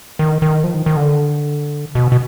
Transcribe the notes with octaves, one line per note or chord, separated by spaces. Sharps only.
D#3
D#3
F3
D#3
D#3
D3
B2
B2